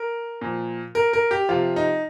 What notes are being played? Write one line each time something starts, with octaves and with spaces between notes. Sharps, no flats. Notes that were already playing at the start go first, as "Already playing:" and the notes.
Already playing: A#4
A#2 F3
A#4
A#4
G4
C3 F3 F4
D#4